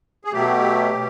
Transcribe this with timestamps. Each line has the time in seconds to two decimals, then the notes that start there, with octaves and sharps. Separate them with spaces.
0.25 G#4
0.32 B2 F#3 A3 G4
0.93 B2